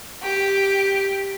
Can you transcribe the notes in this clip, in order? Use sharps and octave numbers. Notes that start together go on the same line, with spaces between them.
G4